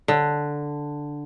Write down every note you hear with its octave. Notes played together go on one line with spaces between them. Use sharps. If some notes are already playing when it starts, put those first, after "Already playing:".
D3